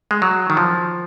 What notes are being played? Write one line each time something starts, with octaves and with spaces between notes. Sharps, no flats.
G#3
F#3
D#3
F3